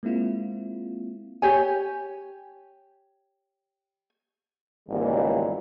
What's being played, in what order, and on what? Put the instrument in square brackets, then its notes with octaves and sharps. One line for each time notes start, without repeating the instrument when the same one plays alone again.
[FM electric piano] G#3 A#3 C4 E4 F4
[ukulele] G4 C#5 G#5
[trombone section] G#1 C#2 A#3 [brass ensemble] E3 G3